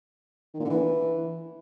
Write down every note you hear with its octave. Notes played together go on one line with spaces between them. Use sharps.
D#3
A#2
D3
E3